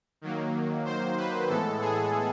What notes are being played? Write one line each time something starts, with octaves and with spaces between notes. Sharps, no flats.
D#3 F#3 A#3
C5
B4
A2 E3 G#3 B3 A4
G#4